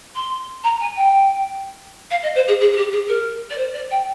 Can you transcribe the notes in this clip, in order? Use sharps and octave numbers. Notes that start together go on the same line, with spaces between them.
C6
A#5
G#5
G5
F5
D#5
C5
G#4
G#4
G#4
G4
G#4
A#4
D5
C5
D5
G5